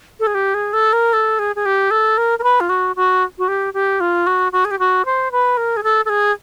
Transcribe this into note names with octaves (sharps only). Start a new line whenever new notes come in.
A4
G#4
G4
G#4
A4
A#4
A4
G#4
G#4
G4
A4
A#4
A#4
B4
F4
F#4
F#4
F#4
G4
G4
F4
F#4
F#4
G#4
G4
F#4
C5
B4
A#4
G#4
A4
A4
G#4